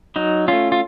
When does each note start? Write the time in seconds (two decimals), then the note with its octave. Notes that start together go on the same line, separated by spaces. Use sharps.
0.16 F#3 D#4
0.48 A3 C#4 F4
0.72 F4